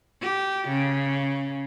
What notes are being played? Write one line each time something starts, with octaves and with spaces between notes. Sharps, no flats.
G4
C#3